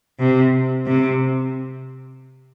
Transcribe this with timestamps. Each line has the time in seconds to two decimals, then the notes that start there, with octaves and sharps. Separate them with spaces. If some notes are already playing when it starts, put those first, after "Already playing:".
0.19 C3
0.86 C3